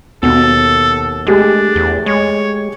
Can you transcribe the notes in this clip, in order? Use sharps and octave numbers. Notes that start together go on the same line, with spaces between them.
D#2 B2 A4
G#3 A3 D4 G4 G#4
E2
G#3 C#5